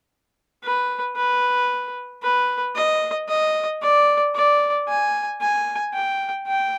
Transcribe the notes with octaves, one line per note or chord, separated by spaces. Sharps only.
B4
B4
B4
D#5
D#5
D5
D5
G#5
G#5
G5
G5